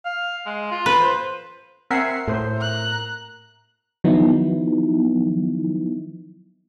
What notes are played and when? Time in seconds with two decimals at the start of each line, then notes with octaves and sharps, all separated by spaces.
0.05 F5
0.46 G#3
0.71 F4
0.86 B4
1.00 C5
1.91 C4 A#4 E5 F#5 G#5 C7
2.27 A2 A4 C5
2.58 A#5 F#6
4.04 D#3 F3 F#3 B3 D#4 E4